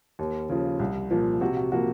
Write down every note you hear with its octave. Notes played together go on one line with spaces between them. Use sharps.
D#2
C#3 F3
C2
A#2 F3
C3 F#4
F#4
F3 A#3 F#4